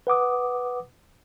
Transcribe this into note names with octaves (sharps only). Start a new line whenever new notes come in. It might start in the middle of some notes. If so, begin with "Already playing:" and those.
B4 F#5 D6 D#6